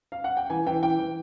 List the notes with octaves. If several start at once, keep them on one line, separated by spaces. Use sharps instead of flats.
F5
F#5
G5
E3 G#5
E3 G5
E3 G5
E3